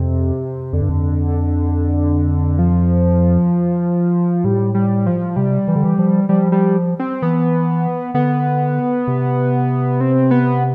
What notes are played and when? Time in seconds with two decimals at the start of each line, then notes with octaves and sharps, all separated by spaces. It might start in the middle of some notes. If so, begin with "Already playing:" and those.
Already playing: F2 C3
0.73 F2 D3
0.82 G2
0.89 F2
2.59 F3
4.44 A2 G3
4.74 G3
5.06 F3
5.36 C3 G3
5.68 E3
5.76 D3
5.84 E3
5.99 F3
6.29 F3 G3
6.52 G3
6.99 C4
7.22 E3 B3
8.14 D3 B3
9.07 C3
10.01 C4
10.31 B3